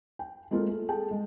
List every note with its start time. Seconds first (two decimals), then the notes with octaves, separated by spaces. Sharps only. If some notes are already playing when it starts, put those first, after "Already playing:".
0.19 G5
0.51 G#3 A#3 C4 F4 G#4 A4
0.67 A3
0.89 G#4 A4 G5 A5
1.11 G#3